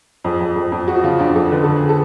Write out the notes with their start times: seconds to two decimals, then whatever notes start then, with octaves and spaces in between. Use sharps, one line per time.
0.24 F2 G#4
0.40 F2
0.56 F2
0.72 F2
0.88 F3 F#4
1.03 C#3 F4
1.19 F2 D4
1.35 F2 A4
1.51 D3 B4
1.64 D3 A4
1.76 G#4
1.89 A4